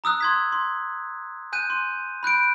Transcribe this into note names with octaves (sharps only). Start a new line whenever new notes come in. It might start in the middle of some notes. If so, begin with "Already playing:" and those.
A#5 D#6 E6 F#6
C6 G#6 B6
C6
G#5 F#6 G6 D#7
C6
B5 F#6 G6 D7